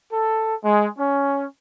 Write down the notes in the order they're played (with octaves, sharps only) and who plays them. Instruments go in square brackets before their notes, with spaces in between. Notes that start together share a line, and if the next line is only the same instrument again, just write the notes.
[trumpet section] A4
G#3
C#4